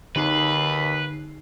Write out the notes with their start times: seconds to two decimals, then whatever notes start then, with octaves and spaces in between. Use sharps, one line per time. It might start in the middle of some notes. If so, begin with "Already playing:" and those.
0.16 D#2 D3 D#4 B4 C7